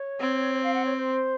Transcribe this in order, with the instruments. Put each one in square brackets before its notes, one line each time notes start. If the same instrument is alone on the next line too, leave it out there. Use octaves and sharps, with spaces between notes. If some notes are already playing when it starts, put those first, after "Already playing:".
Already playing: [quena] C#5
[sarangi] C4
[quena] F5
F#5
C#5
C5